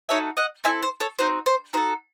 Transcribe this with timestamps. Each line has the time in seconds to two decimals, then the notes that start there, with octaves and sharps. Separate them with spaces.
0.09 A3 D#4 F#4 A4 C#5 E5
0.37 D#5 F#5
0.64 C4 E4 A4 E5 G#5
0.83 C5
1.00 A4 C#5
1.19 C4 D#4 F#4 C5
1.46 C5
1.73 D#4 F#4 A4 C5